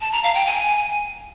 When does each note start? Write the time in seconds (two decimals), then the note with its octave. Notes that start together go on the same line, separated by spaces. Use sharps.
0.01 A5
0.12 A#5
0.23 F5
0.35 G5
0.46 G#5